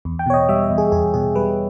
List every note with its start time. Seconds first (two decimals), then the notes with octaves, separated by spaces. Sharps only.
0.05 E2
0.19 G5
0.26 B2 C#5
0.34 D#5
0.49 G3 E5
0.64 D#5
0.70 E2
0.78 G#4
0.92 E2 G#4
1.14 B2 G#4
1.35 G3 B4